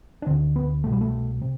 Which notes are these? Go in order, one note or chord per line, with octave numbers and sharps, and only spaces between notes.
D4
D2 D3 C4
B3
C2 B2 A3
G3
A3
C3